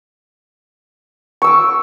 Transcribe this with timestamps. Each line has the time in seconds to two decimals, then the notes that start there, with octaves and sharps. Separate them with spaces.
1.42 C#6
1.44 E6
1.47 D6